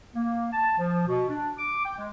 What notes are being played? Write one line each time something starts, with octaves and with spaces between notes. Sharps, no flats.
A#3
A5
F3
B2
D4
D6
G5
G#3